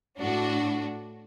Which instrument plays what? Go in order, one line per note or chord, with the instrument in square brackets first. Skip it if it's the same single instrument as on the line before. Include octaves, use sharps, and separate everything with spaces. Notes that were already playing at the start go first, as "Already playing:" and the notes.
[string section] A2 D4 F#4